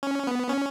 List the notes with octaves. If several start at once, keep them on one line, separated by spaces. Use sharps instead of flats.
C#4
B3
C#4